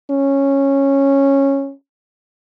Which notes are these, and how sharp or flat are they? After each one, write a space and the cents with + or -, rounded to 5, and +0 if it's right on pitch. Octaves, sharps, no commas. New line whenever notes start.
C#4 -10